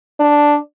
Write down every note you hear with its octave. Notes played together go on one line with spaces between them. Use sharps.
D4